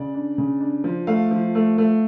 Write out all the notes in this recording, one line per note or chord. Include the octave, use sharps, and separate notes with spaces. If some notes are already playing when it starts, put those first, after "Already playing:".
Already playing: C#3 D5
D4
C#3
D4
F3
A3 F5
F3
A3
A3